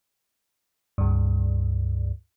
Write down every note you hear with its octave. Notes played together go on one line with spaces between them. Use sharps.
C#2 G2